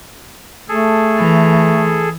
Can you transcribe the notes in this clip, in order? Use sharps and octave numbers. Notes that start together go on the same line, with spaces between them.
A3 G#4 A4
E3